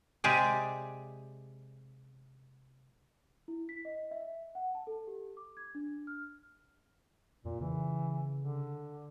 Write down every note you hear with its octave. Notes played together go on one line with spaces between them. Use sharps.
C3 G#3 G4 G#4 D5
E4
B6
D#5
E5
F#5
A5
A4
G4
D6
G#6
D4
F6
F2 A#2
C#3 E3
D3